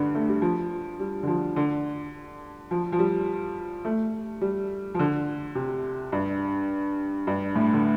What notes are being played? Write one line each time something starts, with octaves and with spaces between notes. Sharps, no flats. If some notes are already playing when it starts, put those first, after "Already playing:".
Already playing: G2 D3
A3
G3
F3
G3
D3
F3
D3
F3
F3
G3
A3
G3
F3
D3
C3
G2
G2
A2
D3